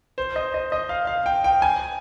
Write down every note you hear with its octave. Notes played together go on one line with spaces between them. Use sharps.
C5
D#5
D#5
D#5
F5
F5
G5
G5
G#5